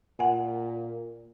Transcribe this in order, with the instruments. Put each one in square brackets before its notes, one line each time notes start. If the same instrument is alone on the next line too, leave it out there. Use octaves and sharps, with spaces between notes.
[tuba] A#2 [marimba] F#5 G#5